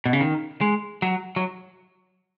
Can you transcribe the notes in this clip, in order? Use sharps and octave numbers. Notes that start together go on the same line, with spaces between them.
B2
C#3
D#3
G#3
F#3
F#3